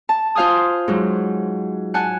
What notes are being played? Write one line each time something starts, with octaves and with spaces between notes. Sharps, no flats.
A5
F4 C5 F5 G#5 D#6
G#2 F#3
F#5 G#5 A5 F#6